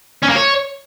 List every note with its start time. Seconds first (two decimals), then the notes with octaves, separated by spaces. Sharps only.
0.23 C#4
0.30 A#3
0.36 C#5